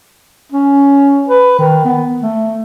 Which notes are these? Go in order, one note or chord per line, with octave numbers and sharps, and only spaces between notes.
C#4
B4
D#3
B3
A3